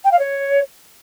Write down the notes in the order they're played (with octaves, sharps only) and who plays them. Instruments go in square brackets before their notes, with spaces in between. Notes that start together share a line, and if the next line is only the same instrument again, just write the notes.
[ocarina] G5
F5
C#5